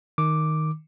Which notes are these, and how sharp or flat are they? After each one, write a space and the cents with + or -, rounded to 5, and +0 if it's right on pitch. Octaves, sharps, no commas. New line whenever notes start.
D#3 +0 D6 +0